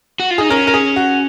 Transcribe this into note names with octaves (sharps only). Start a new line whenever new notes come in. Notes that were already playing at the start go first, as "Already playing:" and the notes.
F#4
F4
D#4 G#4
C#4 A#4
A#4
G#4
F#4